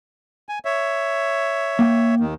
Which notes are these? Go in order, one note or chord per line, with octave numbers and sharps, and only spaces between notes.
G#5
C#5 E5
A#3 G5
D#2 D#3